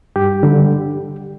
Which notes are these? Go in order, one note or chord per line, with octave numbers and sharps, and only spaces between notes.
G2 G4
D3 G3